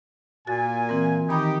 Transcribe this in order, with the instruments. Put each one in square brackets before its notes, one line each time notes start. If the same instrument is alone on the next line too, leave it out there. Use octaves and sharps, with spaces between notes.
[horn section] A#2 G#5 [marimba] F#4 A6
[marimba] E3 C4 A#4
[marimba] D#3 B5 D#6 [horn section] D#4 G4